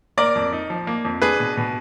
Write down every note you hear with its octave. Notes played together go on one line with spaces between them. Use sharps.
A#3 A#4 D5
F2
D#4
F3
A#3
F2
D4 G#4 B4
B2
B2